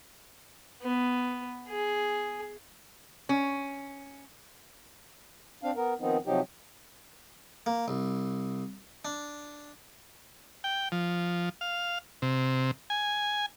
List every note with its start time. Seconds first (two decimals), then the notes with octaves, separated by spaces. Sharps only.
0.82 B3
1.68 G#4
3.29 C#4
5.63 C4 D4 F5
5.76 B3 A#4
6.00 D#3 F3 B3 C4 D#4
6.26 C3 F3 F#3 D#4 G4
7.66 A#3
7.88 C2
9.05 D4
10.64 G5
10.92 F3
11.61 F5
12.22 C3
12.90 G#5